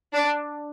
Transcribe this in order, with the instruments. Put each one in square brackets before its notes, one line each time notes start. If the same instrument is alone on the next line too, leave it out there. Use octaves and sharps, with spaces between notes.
[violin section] D4